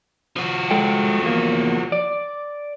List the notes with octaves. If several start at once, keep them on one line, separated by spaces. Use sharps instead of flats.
F3 F#4
G#3 A4 G5
E2 A#3
D5